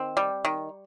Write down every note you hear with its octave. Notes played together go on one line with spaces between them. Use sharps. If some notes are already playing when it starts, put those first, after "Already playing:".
Already playing: D#3 C4
G3
D#3